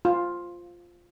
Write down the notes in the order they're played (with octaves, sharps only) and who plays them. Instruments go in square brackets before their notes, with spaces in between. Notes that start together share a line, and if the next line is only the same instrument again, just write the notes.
[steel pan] F4